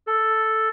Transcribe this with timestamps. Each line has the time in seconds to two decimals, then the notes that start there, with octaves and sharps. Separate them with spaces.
0.07 A4